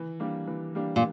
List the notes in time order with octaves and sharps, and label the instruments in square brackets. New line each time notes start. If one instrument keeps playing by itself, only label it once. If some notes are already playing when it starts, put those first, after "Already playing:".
Already playing: [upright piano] E3
G3 A#3 D4 G4
E3
G3 A#3 D4 G4
[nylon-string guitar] A#2